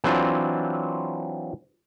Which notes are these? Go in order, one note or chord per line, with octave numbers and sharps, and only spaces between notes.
E3 F#3 C4 D4 F4